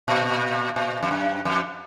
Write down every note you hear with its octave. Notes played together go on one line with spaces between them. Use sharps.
A#2
A#2
F2
F#2
F2